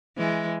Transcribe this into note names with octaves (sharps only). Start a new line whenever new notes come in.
E3 G#3